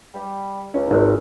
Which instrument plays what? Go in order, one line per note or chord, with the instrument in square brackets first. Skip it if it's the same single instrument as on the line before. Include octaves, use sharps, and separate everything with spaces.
[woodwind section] G3
[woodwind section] C#2 [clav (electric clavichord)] C#4
[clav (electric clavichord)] G#1